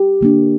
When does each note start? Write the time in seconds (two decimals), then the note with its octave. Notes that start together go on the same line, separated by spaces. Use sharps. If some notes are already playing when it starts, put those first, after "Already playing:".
Already playing: G4
0.21 D3 A#3 D4